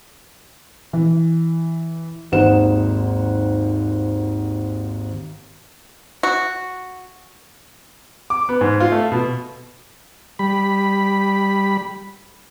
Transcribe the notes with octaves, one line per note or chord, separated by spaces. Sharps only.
E3
G#1 D#2 D#4 C5 F#5 E7
F#4
D6
B3
G#2
F4
A3
B2
G3 B5